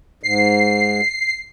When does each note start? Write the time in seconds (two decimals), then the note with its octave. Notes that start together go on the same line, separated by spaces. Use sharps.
0.23 G#2 C7